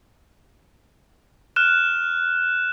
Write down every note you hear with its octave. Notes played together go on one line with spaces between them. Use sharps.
F6 F#6 E7